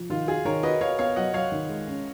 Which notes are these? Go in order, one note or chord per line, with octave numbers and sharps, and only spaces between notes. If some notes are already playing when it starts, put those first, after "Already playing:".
Already playing: F3
D#3 F4
F4 F#4 G#4
D#3 A#4 C#5
F#4 B4 D#5
F#4 C#5 F5
B3 C#5 F5
F#3 D#5 F#5
F#3 C#5 F5
D#3
G#3
C#4